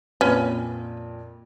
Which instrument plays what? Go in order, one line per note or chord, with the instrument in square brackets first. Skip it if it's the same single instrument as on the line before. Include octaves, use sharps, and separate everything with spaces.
[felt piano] F2 A#2 [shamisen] C#4 B4